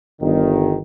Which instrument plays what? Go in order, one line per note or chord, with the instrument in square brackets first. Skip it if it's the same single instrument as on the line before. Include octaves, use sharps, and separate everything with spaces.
[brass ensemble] G1 D#3